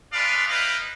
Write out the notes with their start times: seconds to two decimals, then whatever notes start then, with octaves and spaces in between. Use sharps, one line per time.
0.13 G#3 D4 F4 B4 D5 F5
0.48 D#4 E4 B4 D#5 F5 G5